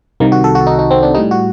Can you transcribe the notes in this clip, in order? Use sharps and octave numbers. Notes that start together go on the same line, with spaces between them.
C2 C3 D#3 A#3
F#4
A4
F#4
D#4
D#4
C4
D4
A2 G3 D#4
F#4